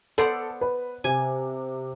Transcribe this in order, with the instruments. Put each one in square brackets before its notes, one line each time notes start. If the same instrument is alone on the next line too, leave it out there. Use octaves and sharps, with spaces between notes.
[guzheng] B3 C5 D5 [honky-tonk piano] A4
[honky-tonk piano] B4
[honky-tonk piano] C3 [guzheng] G#5